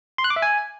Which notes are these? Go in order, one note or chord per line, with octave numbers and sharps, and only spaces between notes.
C6
F#6
D6
E5
G#5